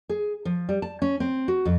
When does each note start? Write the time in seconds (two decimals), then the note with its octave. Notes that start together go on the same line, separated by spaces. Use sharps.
0.09 G#4
0.45 F3
0.69 G3
0.82 A5
1.02 C#4
1.20 C4
1.48 F#4
1.65 F2